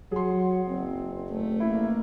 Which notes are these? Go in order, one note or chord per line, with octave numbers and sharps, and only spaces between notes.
F#3 G#4 F#5 C6
F#1 C4
A3
A1 A#3 E4